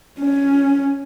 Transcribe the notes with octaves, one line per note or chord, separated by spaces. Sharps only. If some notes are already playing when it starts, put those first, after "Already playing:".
C#4